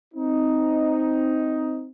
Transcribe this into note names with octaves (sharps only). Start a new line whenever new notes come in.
C4 D#4